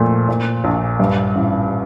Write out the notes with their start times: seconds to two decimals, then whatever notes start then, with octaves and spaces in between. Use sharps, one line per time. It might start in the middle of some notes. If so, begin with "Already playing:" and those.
Already playing: F2 A#2 A3
0.29 A#2
0.64 A#1
1.00 G2
1.35 A1